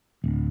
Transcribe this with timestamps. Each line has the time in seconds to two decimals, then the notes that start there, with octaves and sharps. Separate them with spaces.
0.24 D1